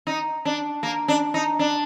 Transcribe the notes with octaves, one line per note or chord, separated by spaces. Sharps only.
D#4
D4
A#3
D4
D#4
D4